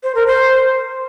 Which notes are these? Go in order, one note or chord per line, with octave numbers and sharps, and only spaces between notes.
C5
A#4
C5